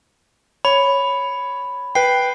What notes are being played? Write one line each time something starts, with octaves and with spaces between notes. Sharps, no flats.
C#5 B5
B4 G5 C7